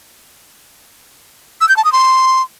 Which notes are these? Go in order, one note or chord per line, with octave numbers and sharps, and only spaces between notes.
E6
G6
A5
D#6
C6